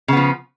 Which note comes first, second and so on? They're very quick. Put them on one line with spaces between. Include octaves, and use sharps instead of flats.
C#3 B3 F3